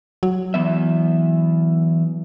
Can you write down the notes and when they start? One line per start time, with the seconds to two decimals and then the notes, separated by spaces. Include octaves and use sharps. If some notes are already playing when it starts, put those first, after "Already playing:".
0.23 F#3
0.54 E3 B3 E5